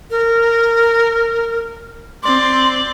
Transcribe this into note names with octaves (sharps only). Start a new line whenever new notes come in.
A#4
C4 D5 C6